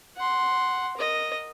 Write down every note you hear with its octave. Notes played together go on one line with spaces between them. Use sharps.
F#5 C6
A#4 D#5